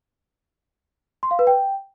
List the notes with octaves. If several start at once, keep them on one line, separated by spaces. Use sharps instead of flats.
C6
F5
B4
G5